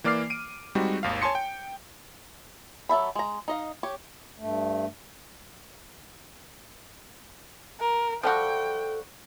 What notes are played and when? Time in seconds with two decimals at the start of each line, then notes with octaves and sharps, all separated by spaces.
0.04 E3 A#3 D5 D6 F6 C7
0.30 D7 D#7
0.75 G3 G#3 C4 D#4 F#4
1.03 G#1 D#2 F5
1.22 C#5 G#5 A5 C6 C#7
1.35 G5
2.89 F#3 A4 E5 B5
3.15 G#3 A#5
3.48 D#4 D#5 F5
3.83 G4 C#5
4.38 G2 A3
7.80 A#4
8.23 F3 G3 F#4 A4 G5